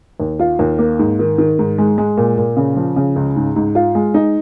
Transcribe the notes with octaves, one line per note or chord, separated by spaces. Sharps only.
D#2
F4
D#2
A#3
G#2
D#3
D#3
G#2
G#3
G#3
A#2
A#2
C#3
F3
C#3
C#2
G#2
G#2
F4
G#3
D#4